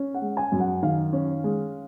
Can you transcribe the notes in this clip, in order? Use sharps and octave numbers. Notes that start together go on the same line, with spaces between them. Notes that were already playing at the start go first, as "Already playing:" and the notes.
Already playing: C#4
F#5
G#3
G#5
F#2
F#5
D#3 F5
C#4
G#3